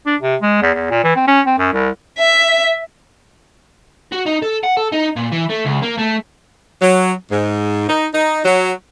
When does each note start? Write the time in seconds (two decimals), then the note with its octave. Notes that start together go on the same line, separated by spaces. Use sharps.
0.06 D4
0.21 C3
0.42 G#3
0.62 E2
0.75 E2
0.91 A#2
1.04 E3
1.16 C4
1.28 C#4
1.46 C4
1.58 F#2
1.73 C2
2.19 E5
4.12 F#4
4.26 D#4
4.42 A4
4.64 F#5
4.77 A4
4.92 D#4
5.16 A#2
5.32 E3
5.50 A3
5.66 C#2
5.83 A#3
5.99 A3
6.81 F#3
7.31 G#2
7.89 D#4
8.14 D#4
8.45 F#3